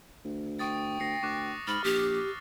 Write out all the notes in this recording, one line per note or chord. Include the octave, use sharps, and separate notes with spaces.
D2
G5 C#6 D#6 A6
D2 A#6 C7 C#7
D2 C#6 D6 F#6
G#2 B5 F6 A6
A#1 G4